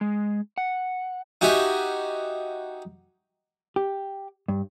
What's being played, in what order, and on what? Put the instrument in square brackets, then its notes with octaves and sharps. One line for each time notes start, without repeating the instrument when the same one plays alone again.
[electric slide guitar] G#3
F#5
[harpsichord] D#4 F#4 G4 E5 G#5
[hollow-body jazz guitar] G4
G2